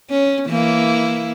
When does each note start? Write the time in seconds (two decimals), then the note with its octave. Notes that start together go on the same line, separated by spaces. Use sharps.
0.10 C#4
0.47 E3 A#3 E4